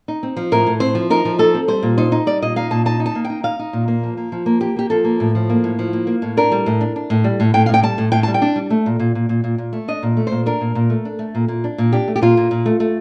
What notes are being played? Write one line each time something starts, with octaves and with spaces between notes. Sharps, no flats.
D#4
C4
F3
A2 A#4
A2
C4 C5
F3
D#4 A#4
F3
D#4 A4
C4
G3 C5
A#2
D#4 C5
D#4
G3 D5
A#2 D#5
D#4 F5
A#2 A5
D#4 A5
D#4
A5
A#3
G5
D#4
D#4 F5
D#4
A#2
A#3
F3
A#3
F3
A#3
A#3 G4
A#3 G4
F3 A4
A#3
A2
F3
A#3
A2
F3
A#3
A#3
A2
D4 A#4
G3
A2
D4
D4
A2
G3
A2
A2 G5
A2 F5
G5
G3 A5
A2
A2 G5
G3 A5
G5
D4
G3
A3
A#2
A#2
A#2
A#2
A#2
A#2
A3
D4 D#5
A#2
A3
A#2 C5
D4 A#4
A#2
A#2
A3
D4
A3
A#2
A#2
D4
A#2
D4 G4
A3
G4
A#2 F4
A#2
A#2
A3
A3